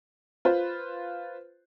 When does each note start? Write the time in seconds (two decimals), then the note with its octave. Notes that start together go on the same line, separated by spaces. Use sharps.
0.45 F4 B4 C5